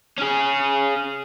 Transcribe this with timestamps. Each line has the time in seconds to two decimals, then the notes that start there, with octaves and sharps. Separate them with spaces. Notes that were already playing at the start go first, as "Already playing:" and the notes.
0.18 C#4 G#4